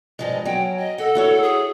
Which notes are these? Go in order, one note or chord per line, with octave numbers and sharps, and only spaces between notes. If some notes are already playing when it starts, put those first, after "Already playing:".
G2 F3 G#3 D#5
F#3 C#4 G5
D#5
A4 F#5
E4 F#4 C#5
G#4